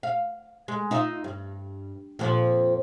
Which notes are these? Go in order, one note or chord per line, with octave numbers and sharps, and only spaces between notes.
F5
G#3
D#4 F4 E5
G2
F2 A#2 F3